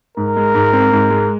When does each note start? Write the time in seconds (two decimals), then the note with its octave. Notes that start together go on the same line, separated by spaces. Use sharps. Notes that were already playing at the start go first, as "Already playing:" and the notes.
0.17 G#2 A#4
0.36 G#3
0.55 G#2
0.73 C4
0.92 G#2
1.10 G#3